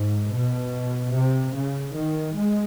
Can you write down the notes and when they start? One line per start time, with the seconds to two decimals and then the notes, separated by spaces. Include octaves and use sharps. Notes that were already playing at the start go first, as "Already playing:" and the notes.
Already playing: G#2
0.33 B2
1.14 C3
1.54 C#3
1.96 D#3
2.36 G#3